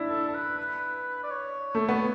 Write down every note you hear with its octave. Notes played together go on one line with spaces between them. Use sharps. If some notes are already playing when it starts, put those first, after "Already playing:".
Already playing: D4 E4
A4
A4
B4
B4
D5
C#5
A3
B3